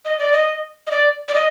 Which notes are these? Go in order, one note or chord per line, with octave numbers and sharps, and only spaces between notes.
D#5
D5
D#5
D#5
D5
D5
D#5